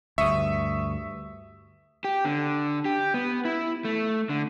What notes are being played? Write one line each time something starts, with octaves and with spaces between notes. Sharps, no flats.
D2 G2 E5 C#6 D#6
G4
D3
G4
B3
E4
A3
D3